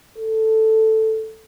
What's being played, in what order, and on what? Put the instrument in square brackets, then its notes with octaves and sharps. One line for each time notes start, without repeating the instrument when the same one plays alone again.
[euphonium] A4